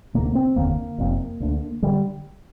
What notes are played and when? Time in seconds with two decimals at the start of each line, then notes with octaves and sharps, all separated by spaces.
0.14 D2 C3 A#3
0.35 C4
0.56 F1 D#2 D3 A#3
0.98 F1 F2 C3
1.40 D2 D3
1.82 D3 G3